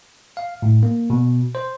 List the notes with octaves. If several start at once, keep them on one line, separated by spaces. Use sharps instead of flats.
F5
A2
A#3
B2
C5